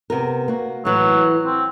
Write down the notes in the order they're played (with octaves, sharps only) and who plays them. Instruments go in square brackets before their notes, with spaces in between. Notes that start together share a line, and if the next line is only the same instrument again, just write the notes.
[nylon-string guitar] C3 B3 A#4
A#3 F#4
[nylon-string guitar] A2 E3 [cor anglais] F#3
[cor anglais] C4